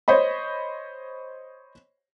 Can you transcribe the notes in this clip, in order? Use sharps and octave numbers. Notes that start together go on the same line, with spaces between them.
C5 C#5 D#5 B5